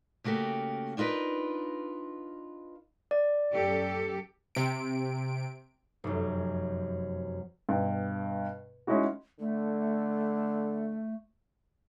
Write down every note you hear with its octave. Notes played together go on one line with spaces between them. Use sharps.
C#3 A3 A#3 F#4 G4
D4 D#4 F4 A#4 B4
D5
F#2 G4 A4
C3 D7
F1 F#2
G2 B2
G#3 C#4 D#4 E4 F#4
D3 A3